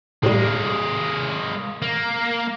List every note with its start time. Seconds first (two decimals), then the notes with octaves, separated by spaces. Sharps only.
0.23 A2 G3 G#3 A#3
1.82 A#3